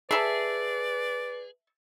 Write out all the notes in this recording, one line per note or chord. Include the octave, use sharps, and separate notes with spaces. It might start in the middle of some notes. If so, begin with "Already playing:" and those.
G#4 A4 B4 D5 E5